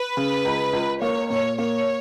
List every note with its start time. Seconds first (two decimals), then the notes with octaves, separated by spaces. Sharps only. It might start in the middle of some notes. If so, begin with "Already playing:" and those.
Already playing: B4
0.17 C#3
0.45 C#2
0.73 C#2
1.01 A#3 C#5
1.30 A#2 C#5
1.58 A#3 C#5